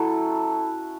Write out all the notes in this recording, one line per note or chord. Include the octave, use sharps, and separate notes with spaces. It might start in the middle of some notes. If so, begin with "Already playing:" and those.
Already playing: F#3 C#4 E4 F#4 A4